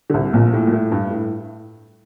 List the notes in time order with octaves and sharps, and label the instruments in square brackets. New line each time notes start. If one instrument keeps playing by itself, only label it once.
[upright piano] D3
C2 C3
A#1 A#2
A2
A#2
A2
G2
A2